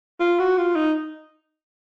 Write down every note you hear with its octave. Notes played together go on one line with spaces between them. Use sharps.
F4
F#4
F4
D#4